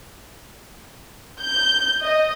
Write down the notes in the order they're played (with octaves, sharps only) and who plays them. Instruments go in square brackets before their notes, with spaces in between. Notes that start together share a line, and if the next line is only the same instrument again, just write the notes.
[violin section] G6
D#5